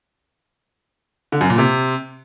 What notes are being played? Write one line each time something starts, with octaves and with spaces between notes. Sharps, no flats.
D3
F#2
A#2
C3